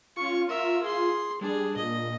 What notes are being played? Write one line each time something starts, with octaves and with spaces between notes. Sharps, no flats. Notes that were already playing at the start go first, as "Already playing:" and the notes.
C#4 F4 C#6
A#4 E5
G#4 C6
G3 D4 G#4
A#2 D#5